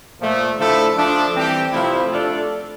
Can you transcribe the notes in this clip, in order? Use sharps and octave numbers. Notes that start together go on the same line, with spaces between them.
A#2 F3 A3
D3 F3 A3 E4 A4
F3 A3 D4
E3 G3 C4 G4
C3 F3 A3 E4
A3 D4 F4 A4